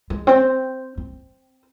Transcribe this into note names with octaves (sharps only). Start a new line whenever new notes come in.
G#3
C4
C4